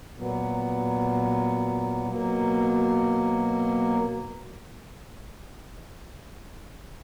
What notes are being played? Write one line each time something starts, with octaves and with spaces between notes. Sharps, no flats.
A#2 F#3 B3
B2 F#3 A#3